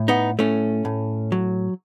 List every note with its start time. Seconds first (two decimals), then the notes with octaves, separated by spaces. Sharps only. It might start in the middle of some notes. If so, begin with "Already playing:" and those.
Already playing: A2
0.08 B3 D#4
0.39 A2 A3 C#4
0.85 A2
1.32 F#3